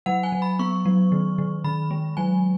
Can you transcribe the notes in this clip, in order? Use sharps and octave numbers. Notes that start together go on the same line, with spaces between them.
F#3 F#5
G#5
F#3
B5
B3 C#6
F#3
D#3
D#3
D#3 B5
G#3
F#3 G#5